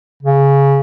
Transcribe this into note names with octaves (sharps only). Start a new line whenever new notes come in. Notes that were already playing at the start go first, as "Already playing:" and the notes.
C#3